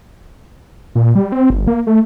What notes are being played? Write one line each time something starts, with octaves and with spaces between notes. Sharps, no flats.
A#2
G3
C4
G1
A#3
A3